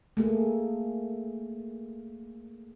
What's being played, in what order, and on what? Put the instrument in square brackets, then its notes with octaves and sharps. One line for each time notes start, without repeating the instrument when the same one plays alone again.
[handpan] A3 A#3 G#4